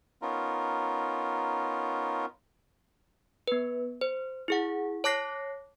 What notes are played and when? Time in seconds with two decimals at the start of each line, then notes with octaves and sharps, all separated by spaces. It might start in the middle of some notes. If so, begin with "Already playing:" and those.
0.22 B3 C#4 D#4 F4 A#4
3.48 B3 B4
4.01 C5
4.48 E4 G#4 F#5
5.04 C#5 A5 D6 F#6 A#6 C7